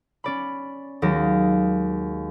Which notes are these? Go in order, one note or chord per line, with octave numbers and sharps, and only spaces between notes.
C#4 D5 B5
D#2 F#3 G#3 A#3